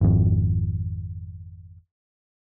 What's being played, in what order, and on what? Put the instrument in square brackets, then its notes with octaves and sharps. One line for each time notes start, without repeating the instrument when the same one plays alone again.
[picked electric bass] G#1 F2